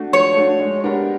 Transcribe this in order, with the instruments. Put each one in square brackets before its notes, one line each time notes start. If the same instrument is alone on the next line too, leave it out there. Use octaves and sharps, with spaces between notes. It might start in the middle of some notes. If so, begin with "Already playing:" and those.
Already playing: [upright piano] A3 D4 F#4
[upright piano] F3 [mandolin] C#5
[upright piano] A3 D4 F#4
G#3
B3 D4 G4 A#4